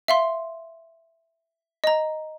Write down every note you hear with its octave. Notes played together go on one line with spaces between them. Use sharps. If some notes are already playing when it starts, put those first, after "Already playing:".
E5 F5 C6
D#5 A#5